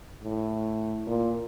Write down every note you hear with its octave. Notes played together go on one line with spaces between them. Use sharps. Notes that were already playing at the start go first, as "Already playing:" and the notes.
A2
A#2